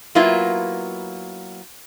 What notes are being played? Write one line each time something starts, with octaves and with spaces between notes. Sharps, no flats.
F#3 A#3 B3 E4 F4